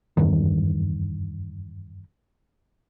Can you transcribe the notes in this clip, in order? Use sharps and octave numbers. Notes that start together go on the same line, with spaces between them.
F#1 E2 G2 D#3